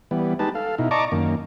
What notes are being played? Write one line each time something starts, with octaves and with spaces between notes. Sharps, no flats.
E3 G3 B3
G#3 D#4 G4 B4 A5
A4 F5
B2 D#4 E4
D5 D#5 A5 A#5 C#6 D6
F#2 D#3 A#3